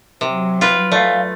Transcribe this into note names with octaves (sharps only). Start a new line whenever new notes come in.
C3 F#3
F4 B4
A3 D5 F5